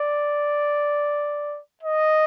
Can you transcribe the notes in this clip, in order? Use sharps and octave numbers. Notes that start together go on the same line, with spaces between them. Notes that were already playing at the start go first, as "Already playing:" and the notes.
Already playing: D5
D#5